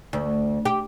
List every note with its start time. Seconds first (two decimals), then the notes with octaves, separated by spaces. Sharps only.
0.13 D2
0.65 G4